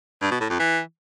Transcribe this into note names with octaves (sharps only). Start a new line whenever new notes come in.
G2
B2
A2
F2
E3